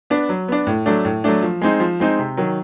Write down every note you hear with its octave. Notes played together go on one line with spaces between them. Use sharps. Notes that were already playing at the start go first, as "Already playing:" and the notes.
B3 D4
F#3
B3 D4
A2
F#3 A3 D4
A2
F#3 A3 D4
F3
G#3 C4 D#4
F3
G#3 C4 D#4
C3
D#3 F#3